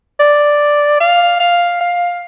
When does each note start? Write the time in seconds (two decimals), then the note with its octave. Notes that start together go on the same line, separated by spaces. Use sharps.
0.20 D5
1.00 F5
1.40 F5
1.81 F5